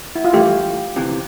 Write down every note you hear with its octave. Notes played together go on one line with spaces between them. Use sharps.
E4
F4
G2 E3 A3 G4
D2 C3 E3